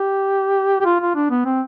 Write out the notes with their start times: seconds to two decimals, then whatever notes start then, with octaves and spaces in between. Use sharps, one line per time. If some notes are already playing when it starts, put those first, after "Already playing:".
Already playing: G4
0.81 G4
0.86 F4
1.00 F4
1.15 D4
1.30 B3
1.45 C4